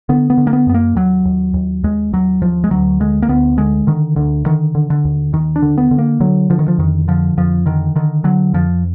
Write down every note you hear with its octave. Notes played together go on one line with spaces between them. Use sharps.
D3 B3
B3
D3
A#3
B3
F#2 B3
A#3
D#2 F#3
D#2
D#2
D#2 G#3
D#2 F#3
D#2 F3
G#3
D2 F#3
D3 G#3
A#3
D2 B3
D3 G#3
D3 D#3
D2 D3
D3 D#3
D3
D3
D#2
D#2 D#3
D4
D3
B3
D3
A#3
D3 F#3
D3 F3
D#3
F3
F2 D#3
D3 F3
F2 F3
D3 D#3
D3 D#3
D3 F#3
F2 F3